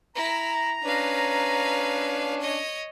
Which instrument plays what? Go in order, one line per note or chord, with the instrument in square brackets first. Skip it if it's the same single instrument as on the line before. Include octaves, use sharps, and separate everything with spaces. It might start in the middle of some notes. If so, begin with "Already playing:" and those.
[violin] E4 [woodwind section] A#5
[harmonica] C#4 D4 [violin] B4 F5
[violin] C#5 D#5